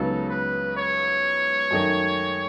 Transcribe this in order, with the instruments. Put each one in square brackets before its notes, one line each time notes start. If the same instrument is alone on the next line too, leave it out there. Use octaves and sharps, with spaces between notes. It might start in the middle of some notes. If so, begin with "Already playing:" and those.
Already playing: [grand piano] C#2 C#3 F#3 B3 D#4 [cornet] A4
[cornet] B4
C#5
[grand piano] F#2 D#3 A3 D#4